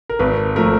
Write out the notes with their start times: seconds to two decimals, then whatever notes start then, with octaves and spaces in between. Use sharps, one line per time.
0.10 A#4
0.19 G#1 B4
0.56 F3 A3 A#4